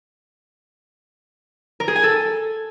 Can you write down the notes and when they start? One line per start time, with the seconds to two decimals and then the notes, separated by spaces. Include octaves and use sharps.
1.80 A#4
1.88 G#4
1.96 G#5
2.03 A4